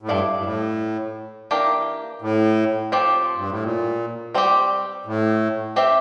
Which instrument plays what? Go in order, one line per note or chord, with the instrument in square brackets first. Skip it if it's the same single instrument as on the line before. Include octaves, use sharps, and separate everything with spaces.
[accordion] A2
[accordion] G2 [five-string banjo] E4 A4 D5 F5
[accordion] G2
A2
[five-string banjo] E3 A#3 D4 G4 A#4
[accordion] A2
[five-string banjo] F3 C4 G4
[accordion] G2
A2
A#2
[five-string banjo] G3 C4 G4
[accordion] A2
[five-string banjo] C4 G4 C5 E5